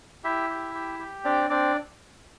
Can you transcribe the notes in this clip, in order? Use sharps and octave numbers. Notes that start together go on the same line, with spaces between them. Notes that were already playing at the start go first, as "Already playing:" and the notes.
E4 G4 E5
G4
G4
G4
C4 D4 D5
C4 D4 D5